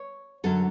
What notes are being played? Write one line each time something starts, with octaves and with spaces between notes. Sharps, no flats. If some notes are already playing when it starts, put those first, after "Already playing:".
Already playing: C#5
F#2 D3 F#3 C#4 A4